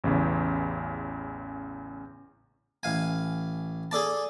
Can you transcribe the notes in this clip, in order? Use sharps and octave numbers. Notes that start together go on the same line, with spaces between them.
A1 E2 C#3
A1 F5 G#5
G#4 A4 D5 A5